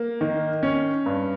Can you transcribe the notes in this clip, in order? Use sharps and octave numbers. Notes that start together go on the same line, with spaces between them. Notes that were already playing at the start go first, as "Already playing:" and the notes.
Already playing: A#3
D#3
C#4
G2